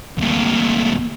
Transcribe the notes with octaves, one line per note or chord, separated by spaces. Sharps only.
D2 A#2